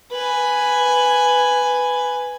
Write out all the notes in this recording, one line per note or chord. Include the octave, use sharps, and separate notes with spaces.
B4 G#5